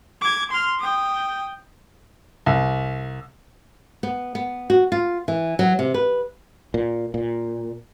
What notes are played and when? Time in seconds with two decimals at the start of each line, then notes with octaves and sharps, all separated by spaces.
0.21 D6 G#6
0.51 C6 F6
0.80 G5 D#6
2.46 C2
4.03 B3
4.35 B3
4.70 F#4
4.92 F4
5.28 E3
5.59 F#3
5.79 C3
5.94 B4
6.74 A#2
7.14 A#2